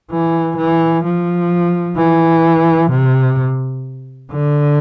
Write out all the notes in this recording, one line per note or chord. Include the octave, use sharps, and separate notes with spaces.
E3
E3
F3
E3
C3
D3